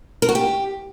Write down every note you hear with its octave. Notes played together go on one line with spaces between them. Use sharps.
A#4
F#4
G4